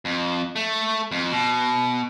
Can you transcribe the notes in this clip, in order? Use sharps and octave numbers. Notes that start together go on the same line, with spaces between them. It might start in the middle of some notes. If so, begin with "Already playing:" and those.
F2
A3
F2
B2